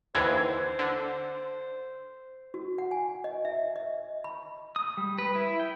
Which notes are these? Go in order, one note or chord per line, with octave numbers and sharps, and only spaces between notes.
D#2 D3 E3 C5 G#6
D3
F#4
F#5
G#5
D#5
E5
D#5
B5
D#6
G3
B4
E4
G5